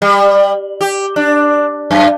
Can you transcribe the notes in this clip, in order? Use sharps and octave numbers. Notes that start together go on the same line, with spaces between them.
G3
G4
D4
F#2